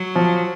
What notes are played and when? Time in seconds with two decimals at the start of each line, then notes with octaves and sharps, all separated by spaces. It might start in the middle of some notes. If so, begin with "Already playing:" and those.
Already playing: F#3
0.15 F3